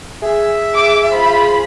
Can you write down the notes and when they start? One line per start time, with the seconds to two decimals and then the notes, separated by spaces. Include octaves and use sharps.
0.22 G#4 E5
0.74 D6
1.08 F4 C5 B5